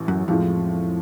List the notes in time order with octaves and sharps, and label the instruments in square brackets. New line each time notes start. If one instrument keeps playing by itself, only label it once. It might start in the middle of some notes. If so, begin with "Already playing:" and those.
Already playing: [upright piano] A1 A2 E3
[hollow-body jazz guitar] F#2
[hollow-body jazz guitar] F2 [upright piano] A2 F3 G#3